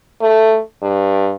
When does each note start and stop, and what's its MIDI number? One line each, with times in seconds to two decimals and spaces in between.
0.21 0.59 57
0.82 1.33 43